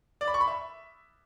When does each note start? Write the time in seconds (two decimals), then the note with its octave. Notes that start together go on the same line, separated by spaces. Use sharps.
0.21 D5
0.28 B5
0.34 C#6
0.41 B5
0.47 E5